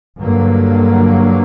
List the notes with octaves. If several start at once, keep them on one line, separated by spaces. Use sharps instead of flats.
G2 D3 F#3 A#3